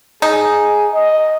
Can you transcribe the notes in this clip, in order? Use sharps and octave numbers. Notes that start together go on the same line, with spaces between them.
D#4 G#4
D#5